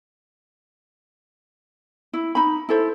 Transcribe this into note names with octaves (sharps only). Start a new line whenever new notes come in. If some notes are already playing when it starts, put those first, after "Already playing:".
E4
D#4 B5
E4 A4 C5